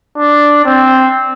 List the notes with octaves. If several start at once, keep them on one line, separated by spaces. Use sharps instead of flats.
D4
C4